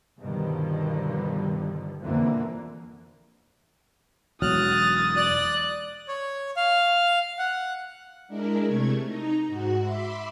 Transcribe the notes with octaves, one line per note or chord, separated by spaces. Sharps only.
G2 B2 D3 D#3 F3 G3
F2 B2 D3 E3 A#3
E1 F#3 D#6 F6 F#6 A6
D5 F#6
C#5
F5
F#5
G#3 D4 E4 A#4
C3 A3 C#6 G#6
D#4 A#5
G#2 F#4 F#5
E5 B5 C6 D6 E6